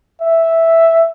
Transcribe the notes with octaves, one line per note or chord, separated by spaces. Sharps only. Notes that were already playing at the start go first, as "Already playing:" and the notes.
E5